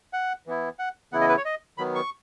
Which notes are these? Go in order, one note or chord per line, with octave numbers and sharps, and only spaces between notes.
F#5
E3 B3 E4
F#5
C#3 E3 B3 E4 F#5
D#5
B4
C#5
D#5
D#3 F#3 B3 B5
C#6